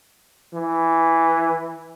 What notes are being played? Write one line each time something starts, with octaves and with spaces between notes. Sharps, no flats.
E3